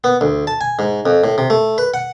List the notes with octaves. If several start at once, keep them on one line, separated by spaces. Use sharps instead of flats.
B3
D2
A5
G#5
G#2
F2
A2
C3
A3
B4
F#5